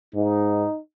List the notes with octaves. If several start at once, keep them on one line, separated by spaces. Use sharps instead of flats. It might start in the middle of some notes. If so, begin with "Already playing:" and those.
G#2 D#4